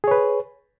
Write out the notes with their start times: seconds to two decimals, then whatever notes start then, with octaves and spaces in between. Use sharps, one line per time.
0.04 G#4
0.08 C#5
0.11 B4